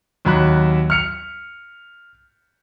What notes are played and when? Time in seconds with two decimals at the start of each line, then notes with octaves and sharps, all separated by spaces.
0.25 D#2 F#3 B5 F#6
0.90 F6 C#7 F7